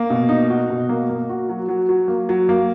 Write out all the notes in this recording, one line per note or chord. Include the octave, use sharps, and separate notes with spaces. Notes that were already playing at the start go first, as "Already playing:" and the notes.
Already playing: A#3
B2
D#4
F#4
B2
A#3
A#3
F#4
F#3
F#3
F#3
A#3
F#3
A#3